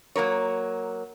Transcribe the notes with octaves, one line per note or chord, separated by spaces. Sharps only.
F#3 A#3 A#4 C#5